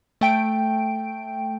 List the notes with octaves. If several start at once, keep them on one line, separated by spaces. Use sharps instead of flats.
A3 G5 D7